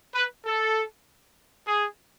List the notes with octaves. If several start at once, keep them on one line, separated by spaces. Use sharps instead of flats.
B4
A4
G#4